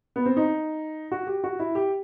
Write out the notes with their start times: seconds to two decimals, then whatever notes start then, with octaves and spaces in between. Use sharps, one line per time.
0.16 B3
0.26 C4
0.37 D#4
1.12 F#4
1.27 G4
1.44 F#4
1.59 E4
1.75 G4